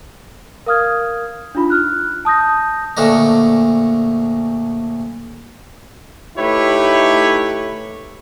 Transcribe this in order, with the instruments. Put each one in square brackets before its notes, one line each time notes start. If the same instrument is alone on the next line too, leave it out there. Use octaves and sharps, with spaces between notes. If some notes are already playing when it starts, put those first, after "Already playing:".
[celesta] A#4 F5 D#6 F6 G#6
D4 D#4 F4 B5
F6 F#6
A5 D#6 G6 A#6
[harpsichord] A#1 A#2 D3 A3 D4 D#5
[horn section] A3 D#4 E4 G4 B4 C#5